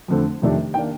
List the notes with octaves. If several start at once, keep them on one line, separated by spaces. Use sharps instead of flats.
F2 D3 A3 C4
F2 C3 D#3 A3 D4
D#3 A#3 D4 G5